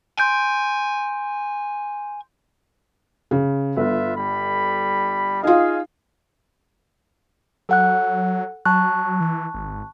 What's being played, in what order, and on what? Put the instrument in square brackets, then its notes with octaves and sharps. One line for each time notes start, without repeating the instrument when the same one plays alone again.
[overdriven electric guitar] G#5 [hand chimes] C6 G6 D7
[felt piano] C#3
[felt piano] G1 [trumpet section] F4 B4 E5
[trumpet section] G3 B5
[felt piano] D#4 F4 [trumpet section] G#4 D#5 F5
[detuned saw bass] F#3 [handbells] A4 F#5 F#6
[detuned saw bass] F#3 [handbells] A5 C#6 F#6
[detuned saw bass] E3
G#1